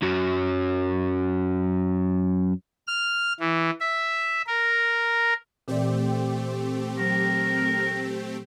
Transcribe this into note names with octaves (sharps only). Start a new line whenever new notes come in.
F#2 F#3
F6
E3
E5
A#4
A#2 E3 A3 C4 G4 D5
F#3 A#4